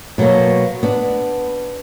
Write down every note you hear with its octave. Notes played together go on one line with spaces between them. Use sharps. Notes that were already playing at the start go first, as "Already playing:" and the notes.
B2 F#3 A#3
B3 D4